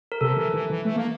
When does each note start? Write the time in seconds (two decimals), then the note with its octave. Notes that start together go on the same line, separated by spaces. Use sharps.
0.12 A#4
0.21 C3 A4
0.37 E3
0.54 E3
0.70 E3
0.85 A3
0.96 A#3